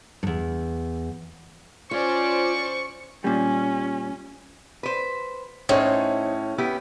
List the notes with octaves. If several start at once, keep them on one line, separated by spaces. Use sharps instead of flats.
E2 G2
C#4 F4 C5 D5 C#6
A#2 G3 C#4
B4 C5
A2 C#4 D#4 C5 C#5
B3 E4 G4